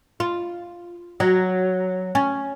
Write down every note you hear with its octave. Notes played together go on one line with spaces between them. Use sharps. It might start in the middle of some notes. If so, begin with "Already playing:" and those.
F4
F#3
C#4